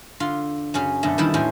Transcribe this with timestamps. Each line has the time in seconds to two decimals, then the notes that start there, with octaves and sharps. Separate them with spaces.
0.20 D3 F4 C6
0.74 F#2 C#3 C#4
1.03 F#2 B2 D3 A3
1.18 F#2 D#3 E3 G3 D#4 E4
1.34 E2 A2 C#4 C5 G5 G#5